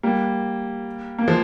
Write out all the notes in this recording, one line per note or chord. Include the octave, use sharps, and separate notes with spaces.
G3 A#3
A#3
F3 G#3